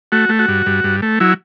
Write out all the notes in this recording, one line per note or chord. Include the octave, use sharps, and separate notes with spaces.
A3 F#4
A3
F#4
G2
G2
G2
A3
F#3 E4